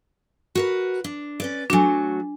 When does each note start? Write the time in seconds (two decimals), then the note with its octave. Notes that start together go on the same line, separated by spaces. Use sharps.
0.55 F#4 A#4 B4
1.04 D4
1.40 C#4 B4 D5
1.70 F#3 A3 D4 F#4 G#5